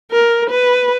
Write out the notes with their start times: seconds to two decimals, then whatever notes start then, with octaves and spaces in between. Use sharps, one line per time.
0.11 A#4
0.50 B4